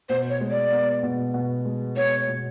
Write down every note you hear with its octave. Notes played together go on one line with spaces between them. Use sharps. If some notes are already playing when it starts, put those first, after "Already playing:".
B2 C5
C#5
G#3
D5
B3
B2
B2
G#3
B3 C#5
B2